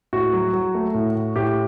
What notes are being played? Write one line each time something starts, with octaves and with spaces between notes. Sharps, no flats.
A2 F#4
F#3
F#3
A3
A2
A2
A2 G4